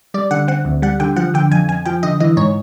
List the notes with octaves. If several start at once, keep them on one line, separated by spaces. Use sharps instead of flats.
G3 D5
D3 F#5
C4 F#5
D2
G3 F#5
D3 G5
F3 F#5
D3 G5
F2 G#5
F2 G#5
F3 G5
D3 D#5
E3 D#5
G#2 C#5